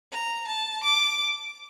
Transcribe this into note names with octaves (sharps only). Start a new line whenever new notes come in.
A#5
A5
D6